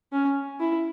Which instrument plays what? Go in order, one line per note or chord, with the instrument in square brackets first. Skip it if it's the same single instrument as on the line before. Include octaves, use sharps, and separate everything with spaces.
[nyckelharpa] C#4
E4